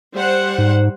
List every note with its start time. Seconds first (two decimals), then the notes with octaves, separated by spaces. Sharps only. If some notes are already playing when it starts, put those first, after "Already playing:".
0.14 G3 C5 F#5
0.58 G#2